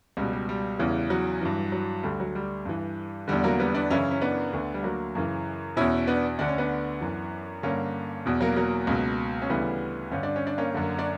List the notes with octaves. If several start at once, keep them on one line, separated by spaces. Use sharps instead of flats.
C#2 B2 G3
G3
G3
E2 C#3 E3
F#3
G2 E3
F#3
D2 D3 G3
F#3
G3
G2 E3
E2 D3 G3
F#3 A#3
G3 B3
B3 D4
F#2 C#3 E3 C#4 E4
C#4
B3 D4
D2 D3
G3
F#3 A#3
F#2 C#3 E3
E2 B2 C#4 E4
B3 D4
D2 D3 D4
C#4
B3 D4
F#2 E3
G2 D3 A#3 C#4
E2 B2
F#3 A#3
F#3 A#3
C#2 B2
C#4
D2 C#3 E3 G3 B3
G2 D3 C#4
D4
C#4
D4
A#3 C#4
F#2 D3
D4